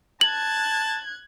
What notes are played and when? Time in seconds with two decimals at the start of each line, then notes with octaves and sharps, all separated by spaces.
0.21 A5 F#6 G#6 F#7